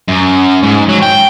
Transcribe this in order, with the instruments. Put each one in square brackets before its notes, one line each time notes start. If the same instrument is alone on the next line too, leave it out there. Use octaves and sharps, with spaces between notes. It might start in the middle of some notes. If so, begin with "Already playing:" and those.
[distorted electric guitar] F#2
G#2
F#3
G5